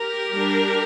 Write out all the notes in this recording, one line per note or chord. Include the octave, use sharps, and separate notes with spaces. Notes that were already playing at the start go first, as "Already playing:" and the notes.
Already playing: G4 A#4
G3 D4